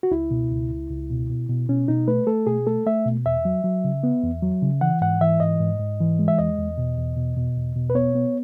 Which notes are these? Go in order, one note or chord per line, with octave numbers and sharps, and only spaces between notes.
F#4
C#2 E4
B2
C#2
C#2
C#2
B2
B2
B2
B2 C#4
B2 D#4
A3 B4
A3 A4
B2 G#4
A3 A4
A3 E5
B2
E2 E5
F#3
F#3
C#3
B3
E2
F#3
C#3
E3 F#5
G#2 F#5
E3 E5
G#2 D#5
G#2
G#2
E3
G#3
E5
E2 D#5
E2
B2
E2
B2
B2
E2
B2
B4
B3 C#5
B3